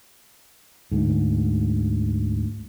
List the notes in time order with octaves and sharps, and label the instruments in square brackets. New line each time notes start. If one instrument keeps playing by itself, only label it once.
[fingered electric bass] D2 G#2